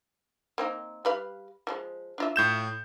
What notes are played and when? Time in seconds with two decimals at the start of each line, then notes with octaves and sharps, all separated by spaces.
0.58 A#3 C4 D#4
1.05 G3 B4 F5
1.67 E3 F3 G#3
2.18 D4 F4 E5
2.36 A2 G6 E7